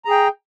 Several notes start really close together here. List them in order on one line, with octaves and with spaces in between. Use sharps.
A#5 G#4 G5